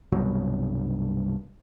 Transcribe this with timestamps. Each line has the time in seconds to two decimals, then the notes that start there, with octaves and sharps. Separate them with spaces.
0.12 C2 G2 B2 F#3